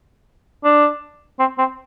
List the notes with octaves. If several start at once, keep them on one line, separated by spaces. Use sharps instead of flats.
D4
C4
C4